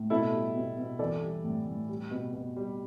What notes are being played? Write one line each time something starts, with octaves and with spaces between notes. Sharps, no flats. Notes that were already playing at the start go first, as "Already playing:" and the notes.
Already playing: A2
B2 E4 A4
G3
B2
B2
E3 A4 D5
G3
A2
A2
G3
B2
B2
G3